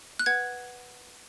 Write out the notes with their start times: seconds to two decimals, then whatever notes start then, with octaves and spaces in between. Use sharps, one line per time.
0.19 F#6
0.26 B4 F#5 G#6